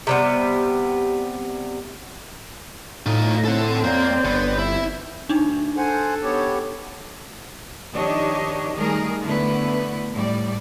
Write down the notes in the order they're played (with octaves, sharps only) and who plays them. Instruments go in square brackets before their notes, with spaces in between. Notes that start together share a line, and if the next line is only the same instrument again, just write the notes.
[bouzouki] C3 G3 B3
[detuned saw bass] A2 [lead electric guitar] D#4 F4
[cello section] C4 [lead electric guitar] A4 F#5
[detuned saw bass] F2 [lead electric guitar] A#3 [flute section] C#5 D5 G6
[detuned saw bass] G1 [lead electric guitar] B3
[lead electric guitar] E4
[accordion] D2 [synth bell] D4 D#4
[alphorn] A4 [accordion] C5 F#5 G#5
[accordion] B3 G4 C#5
[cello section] D#3 F3 D4 G4 C#5 D#5
D#3 G3 A3 G#4 A#4
D3 A3 B3 E4 B4
A2 G3 D5